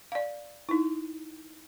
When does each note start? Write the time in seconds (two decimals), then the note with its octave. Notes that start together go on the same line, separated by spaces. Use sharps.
0.12 D5 F5
0.69 D#4 E4